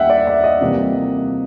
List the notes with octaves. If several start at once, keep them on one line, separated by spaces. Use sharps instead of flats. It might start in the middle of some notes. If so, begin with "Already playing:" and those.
Already playing: D#2 D#3 G3 A#3 D4 E5 F#5 G5
D5
E5
D#5
F2 C3 E3 G3 A#3